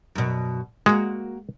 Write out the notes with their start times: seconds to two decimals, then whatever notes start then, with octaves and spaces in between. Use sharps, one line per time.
0.15 F#2 B2
0.86 G#3 A#3 F#4